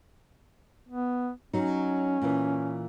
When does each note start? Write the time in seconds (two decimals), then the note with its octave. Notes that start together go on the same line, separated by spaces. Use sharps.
0.89 B3
1.53 F#3 C#4 D#4
2.22 A#2 E3